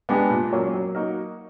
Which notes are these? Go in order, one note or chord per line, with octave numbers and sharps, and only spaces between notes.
G#3 B3 D4 G4
A#2
F#3 A#3 C#4
F#3
A#3 D#4 F#4 A#4